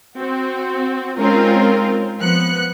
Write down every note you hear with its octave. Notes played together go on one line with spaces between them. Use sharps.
C4 F#4
G#3 C4 C#4 D#4 F4 A#4
F3 B3 F#6 C#7